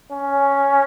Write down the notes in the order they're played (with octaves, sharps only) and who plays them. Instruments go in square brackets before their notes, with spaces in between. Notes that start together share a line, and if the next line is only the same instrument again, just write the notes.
[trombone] C#4